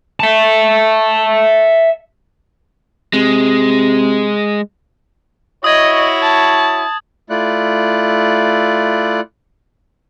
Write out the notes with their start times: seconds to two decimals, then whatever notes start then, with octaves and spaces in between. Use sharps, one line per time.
0.20 E5 A5
3.13 C3 G#3
5.64 E4 F#4 C#5 D#5 D#6 G#6
6.23 A5
7.30 A3 E4 F4 D5 F#6